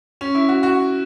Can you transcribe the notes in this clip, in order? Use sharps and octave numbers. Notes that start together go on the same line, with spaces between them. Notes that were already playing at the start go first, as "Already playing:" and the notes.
C#4
E4
F#4
F#4